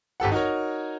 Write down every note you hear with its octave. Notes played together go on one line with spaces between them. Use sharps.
G#1 G4 A4 F#5
D#4 F#4 A#4 C#5